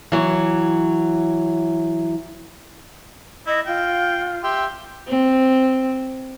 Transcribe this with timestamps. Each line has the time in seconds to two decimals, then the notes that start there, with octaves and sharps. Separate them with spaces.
0.12 E3 F#3
3.47 E4 D#5
3.67 F4 G5
4.43 G4 E5 C6
5.08 C4